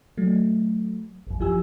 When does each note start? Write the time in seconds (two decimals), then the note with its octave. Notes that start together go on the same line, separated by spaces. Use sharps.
0.17 F#3 A3
1.27 G#1 F2
1.40 G1 F3 E4 G4 G#5 E6